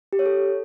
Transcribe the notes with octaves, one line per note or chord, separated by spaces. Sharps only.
G4
C#5
A4